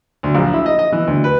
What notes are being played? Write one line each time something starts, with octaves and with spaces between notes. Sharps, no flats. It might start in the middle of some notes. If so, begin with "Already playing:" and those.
D2
A#1
E4
D#5
D#5
E3
D2
B4